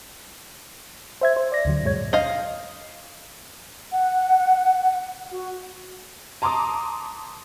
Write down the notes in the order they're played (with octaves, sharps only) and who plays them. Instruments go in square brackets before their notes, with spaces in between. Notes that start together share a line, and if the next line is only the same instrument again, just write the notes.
[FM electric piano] C5 E5 G#6
C5
D5 A#6
D2 D3 F#3
G2 A#2 F#3 G#3 C#5 G#6
[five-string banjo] D#5 F5
[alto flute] F#5
F#4
[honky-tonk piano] A5 A#5 C6 D6 D#6